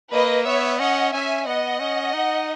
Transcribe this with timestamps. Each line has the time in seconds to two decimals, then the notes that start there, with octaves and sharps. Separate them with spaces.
0.12 A#3 B4 D#5
0.45 B3 C#5 E5
0.79 C#4 D#5 F#5
1.13 C#4 E5 G#5
1.46 B3 D#5 F#5
1.80 C#4
2.14 D#4